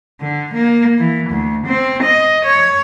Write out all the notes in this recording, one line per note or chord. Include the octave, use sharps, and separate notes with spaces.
D3
A#3
E3
D2
C4
D#5
C#5